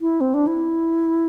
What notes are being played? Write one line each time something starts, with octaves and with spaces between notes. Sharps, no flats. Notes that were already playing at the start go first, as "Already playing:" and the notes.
E4
C4
D4
E4